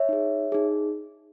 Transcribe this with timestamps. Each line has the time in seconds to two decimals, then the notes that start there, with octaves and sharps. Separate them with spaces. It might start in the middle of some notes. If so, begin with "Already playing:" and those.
Already playing: C#5 E5
0.09 D#4 G#4
0.52 D#4 G#4